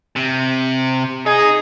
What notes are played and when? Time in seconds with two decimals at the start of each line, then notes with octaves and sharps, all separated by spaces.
0.16 C3
1.26 D#4 G#4